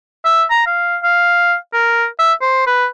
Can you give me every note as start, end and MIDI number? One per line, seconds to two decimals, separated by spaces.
0.25 0.43 76
0.50 0.63 82
0.66 0.97 77
1.03 1.55 77
1.73 2.06 70
2.19 2.33 76
2.41 2.67 72
2.67 2.85 71